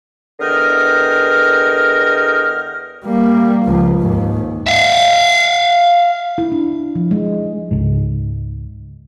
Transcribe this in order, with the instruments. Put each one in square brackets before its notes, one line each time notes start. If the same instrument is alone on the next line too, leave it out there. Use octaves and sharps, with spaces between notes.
[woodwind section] E2 D3 A#4 D#5 G5 F6
[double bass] G3 A#3
C#2 F3
D#2 G#2
[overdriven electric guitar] E5 F5
[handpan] E4
D4
F3
G#3
[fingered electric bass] C#2 G#2